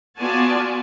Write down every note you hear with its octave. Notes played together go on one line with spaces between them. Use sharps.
B3 F4 F#4 D5 G#5 A5